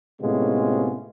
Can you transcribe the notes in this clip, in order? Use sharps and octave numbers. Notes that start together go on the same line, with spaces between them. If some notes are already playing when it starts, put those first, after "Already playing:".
A2 C3 G#3 B3 C#4 F4